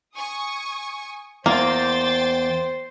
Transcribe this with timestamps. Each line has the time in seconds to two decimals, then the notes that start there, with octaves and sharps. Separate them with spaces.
0.16 G#5 C#6 D#6
1.46 E2 A#3 C5 G5 C6 A6